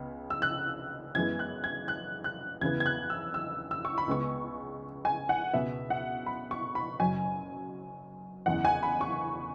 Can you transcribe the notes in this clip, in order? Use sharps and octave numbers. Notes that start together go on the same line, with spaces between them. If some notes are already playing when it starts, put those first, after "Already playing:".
Already playing: C#2 C#3 B3
E6
F#6
F#2 E3 G#3 B3 G#6
F#6
G#6
F#6
F#6
E2 C#3 E3 B3 G#6
G#6
F#6
E6
E6
E6
C#6
B5
C#2 C#3 G#3 B3 C#6
G#5
F#5
C#2 B2 B3 E5
F#5
B5
C#6
B5
F#1 F#2 F#3 G#5
F#1 E2 E3 F#5
G#5
B5
C#6